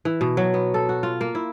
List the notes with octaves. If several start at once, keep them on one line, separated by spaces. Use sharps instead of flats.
E3
B2
F#3
B3
A4
F#4
F4
A#3
E4